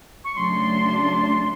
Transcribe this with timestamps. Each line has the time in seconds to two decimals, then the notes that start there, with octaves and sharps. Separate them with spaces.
0.24 C#6
0.35 C#3 F#3 A3 D4 C6